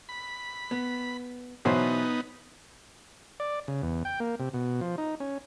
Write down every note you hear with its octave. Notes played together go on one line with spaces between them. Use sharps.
B5
B3
B2 E3 F#3 B3 D#4 E4 C5
D5
C#3
E2
G5
A#3
C3
B2
F3
D#4
C#4